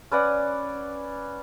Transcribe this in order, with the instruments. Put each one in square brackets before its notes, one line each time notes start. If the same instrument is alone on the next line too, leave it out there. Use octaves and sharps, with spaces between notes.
[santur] C#4 B4 D5 F#5